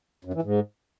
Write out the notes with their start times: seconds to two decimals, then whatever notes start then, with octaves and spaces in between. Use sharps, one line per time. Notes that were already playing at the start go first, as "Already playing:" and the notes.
0.25 F#2
0.34 E3
0.42 G#2